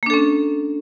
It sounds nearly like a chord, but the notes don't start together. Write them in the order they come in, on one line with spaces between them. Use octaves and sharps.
A#3 D4 A4 C#4